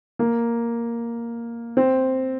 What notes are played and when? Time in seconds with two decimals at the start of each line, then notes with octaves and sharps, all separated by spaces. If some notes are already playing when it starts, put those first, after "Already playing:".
0.19 A#3
1.77 C4